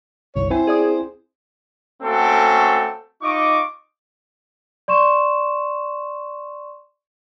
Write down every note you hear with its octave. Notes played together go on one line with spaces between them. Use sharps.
G1 C2 C#5
C4 E4 C5 G#5
G#4 D5 D#6
A3 A#3 C4 C#4 F#4 A4
D#4 F4 D#5 C#6 D6
D5 C6 C#6 E7